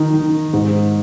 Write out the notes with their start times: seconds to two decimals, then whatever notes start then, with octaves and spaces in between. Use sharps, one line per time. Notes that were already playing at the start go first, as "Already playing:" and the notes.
Already playing: D#3 D#4
0.14 D#3
0.53 G#2